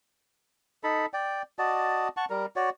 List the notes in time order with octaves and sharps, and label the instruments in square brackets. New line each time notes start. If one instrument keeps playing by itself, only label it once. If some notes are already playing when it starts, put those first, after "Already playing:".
[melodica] D#4 A4 B5
D5 G5
F#4 D5 D#5 A5
F#5 A5 C#6
G3 A#4
F#4 C#5 D5